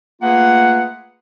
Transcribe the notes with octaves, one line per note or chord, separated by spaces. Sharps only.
A3 A#3 F4 G#4 B4 F#5